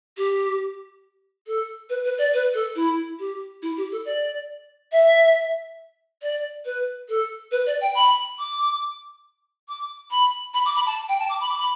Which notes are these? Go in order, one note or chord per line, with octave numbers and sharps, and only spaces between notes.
G4
A4
B4
B4
D5
B4
A4
E4
G4
E4
G4
A4
D5
E5
D5
B4
A4
B4
D5
G5
B5
D6
D6
B5
B5
D6
B5
A5
G5
A5
D6
B5
D6
B5